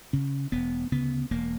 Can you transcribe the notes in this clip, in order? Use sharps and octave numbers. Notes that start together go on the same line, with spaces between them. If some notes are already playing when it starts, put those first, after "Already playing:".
C#3 C#4
E1 B3
D2 C#3 B3
E1 A#3